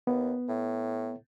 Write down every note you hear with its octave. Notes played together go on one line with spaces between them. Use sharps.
D#2 B3
A2